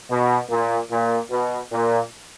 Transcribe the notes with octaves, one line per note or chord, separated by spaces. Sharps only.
B2
A#2
A#2
B2
A#2